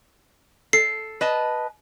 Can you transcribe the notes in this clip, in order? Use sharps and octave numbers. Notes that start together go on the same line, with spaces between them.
A4 C7
B4 D#5 A5